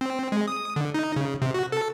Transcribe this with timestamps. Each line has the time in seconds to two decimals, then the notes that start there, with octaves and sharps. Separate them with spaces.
0.01 C4
0.32 G#3
0.48 D#6
0.76 D3
0.94 D#4
1.16 C#3
1.42 C3
1.54 F#4
1.72 A4